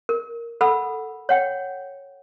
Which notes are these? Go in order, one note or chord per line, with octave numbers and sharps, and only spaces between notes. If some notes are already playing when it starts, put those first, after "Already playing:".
A#4
A4 F#5 B5 E6
C#5 F#5 G5